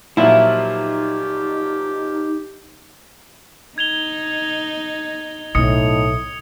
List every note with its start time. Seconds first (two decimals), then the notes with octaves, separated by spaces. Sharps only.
0.17 A#2 F3 F#3 D#4 E4 G4
3.78 D#4 G#6 F7 G7
5.55 B1 A2 D#4 D#6 C#7